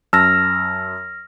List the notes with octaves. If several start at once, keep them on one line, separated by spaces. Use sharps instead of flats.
F#2 A5 E6 F6 A#6